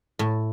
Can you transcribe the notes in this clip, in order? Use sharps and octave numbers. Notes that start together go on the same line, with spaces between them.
A2